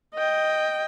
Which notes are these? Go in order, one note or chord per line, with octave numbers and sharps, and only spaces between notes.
D#5 G5